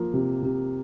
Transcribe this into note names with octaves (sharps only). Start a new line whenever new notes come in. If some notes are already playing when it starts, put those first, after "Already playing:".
Already playing: F3 A#3
C3
C3